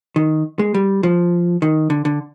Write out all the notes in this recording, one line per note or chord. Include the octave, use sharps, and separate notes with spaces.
D#3
G#3
G3
F3
D#3
D3
D3